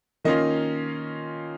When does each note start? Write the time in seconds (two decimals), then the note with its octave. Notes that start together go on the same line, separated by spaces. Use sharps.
0.24 D#3 A#3 C#4 F4 D#5